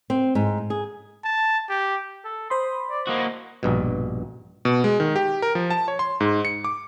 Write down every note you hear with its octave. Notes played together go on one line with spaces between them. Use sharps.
C4
G#2
G#4
A5
G4
A4
C5 B5 C6 D#6
D5
A#3 F#4 D#5
A#1 G2 B2
B2
G#3
D#3
G4
A#4
F3
A5
C#5
C6
G#2
C#7
D6